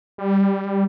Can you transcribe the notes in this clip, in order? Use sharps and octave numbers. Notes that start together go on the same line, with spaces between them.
G3